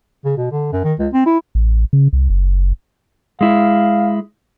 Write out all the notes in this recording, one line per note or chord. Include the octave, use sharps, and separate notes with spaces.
C#3
B2
D3
F#2
D#3
C#2
C4
E4
A1
C#3
C2
F#1
G#3 E4 F5